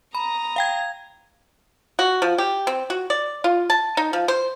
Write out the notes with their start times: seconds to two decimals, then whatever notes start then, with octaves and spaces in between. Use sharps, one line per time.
0.15 A#5 B5 D#6
0.56 F5 G5 G#6
1.99 F#4
2.22 F3
2.38 G4
2.67 C4
2.90 F#4
3.10 D5
3.44 F4
3.70 A5
3.97 D#4
4.13 F3
4.28 C5